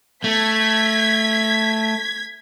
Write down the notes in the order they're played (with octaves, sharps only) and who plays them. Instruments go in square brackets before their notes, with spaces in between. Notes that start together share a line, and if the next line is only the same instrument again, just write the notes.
[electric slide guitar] A3 [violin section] G#6 B6